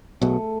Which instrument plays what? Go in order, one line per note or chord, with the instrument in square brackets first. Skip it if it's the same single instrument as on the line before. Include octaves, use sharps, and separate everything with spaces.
[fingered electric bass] B1 B2 [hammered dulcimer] A3